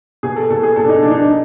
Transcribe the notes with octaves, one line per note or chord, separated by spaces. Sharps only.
B2 G#4
A4
B2 A4
G#4
B2 A4
D4
D#4
B2 D4
D#4
D4